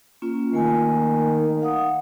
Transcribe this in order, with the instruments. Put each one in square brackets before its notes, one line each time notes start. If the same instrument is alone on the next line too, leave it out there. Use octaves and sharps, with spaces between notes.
[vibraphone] A#3 C#4 F4
[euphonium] D#3 [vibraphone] A3 A#3 G#5
[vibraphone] F5 F#5 D#6